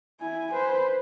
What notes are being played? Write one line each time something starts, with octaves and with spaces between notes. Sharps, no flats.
E4 G#5
B4 C5